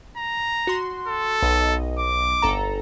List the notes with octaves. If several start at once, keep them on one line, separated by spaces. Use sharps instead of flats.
A#5
F#4 C6
A4
B1 D#5
D6
G1 A4 A#5